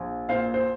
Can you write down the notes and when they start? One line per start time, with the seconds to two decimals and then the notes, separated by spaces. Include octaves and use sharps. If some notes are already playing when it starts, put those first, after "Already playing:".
Already playing: A#1
0.29 A#2 C5 F5
0.54 C5